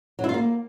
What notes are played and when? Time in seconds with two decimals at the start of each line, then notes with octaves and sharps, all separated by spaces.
0.19 F#3
0.24 E4
0.29 F4
0.34 A#3